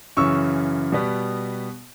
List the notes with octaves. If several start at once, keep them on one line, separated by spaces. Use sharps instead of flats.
F#2 C#3 E3 C#6 E6
B2 G3 B3